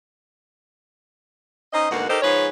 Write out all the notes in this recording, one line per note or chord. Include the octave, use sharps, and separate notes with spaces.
C#4 D#4 C5 D#5
D2 G#2 B2 A#3 F#4
D#4 G4 A4 A#4 C5 D#5
G#2 F3 G#4 B4 C#5